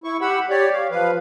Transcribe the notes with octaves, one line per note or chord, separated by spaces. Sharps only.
E4 C#6
G4 F#5 B5 E6
G4 C#5 D5
F5
F3 B4 F5